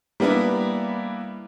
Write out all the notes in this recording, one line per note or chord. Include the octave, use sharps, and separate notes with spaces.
G3 A#3 B3 D4 E4